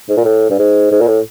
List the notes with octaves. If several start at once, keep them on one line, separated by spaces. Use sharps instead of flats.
G#2
A#2
A2
G2
G#2
G#2
A#2
A2